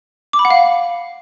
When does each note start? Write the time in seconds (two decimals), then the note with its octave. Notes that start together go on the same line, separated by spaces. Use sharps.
0.33 D6
0.39 B5
0.45 F#5
0.50 F5